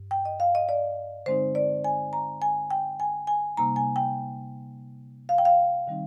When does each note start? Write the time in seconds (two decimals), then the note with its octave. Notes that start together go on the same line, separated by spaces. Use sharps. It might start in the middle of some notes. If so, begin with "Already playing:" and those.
Already playing: G2
0.11 G5
0.25 D#5
0.40 F5
0.55 D#5
0.69 D5
1.26 D3 G#3 C4 D#4 C5
1.55 D5
1.84 G#5
2.13 A#5
2.42 G#5
2.71 G5
3.00 G#5
3.27 G#5
3.57 C3 G3 A#3 D#4 A#5
3.76 G#5
3.96 G5
5.29 F5
5.38 G5
5.45 F5
5.88 D#3 G3 C4 D#4